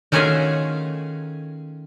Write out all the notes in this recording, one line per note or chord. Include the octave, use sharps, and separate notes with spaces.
D#3 A3 C#4 F4 F#4 G#4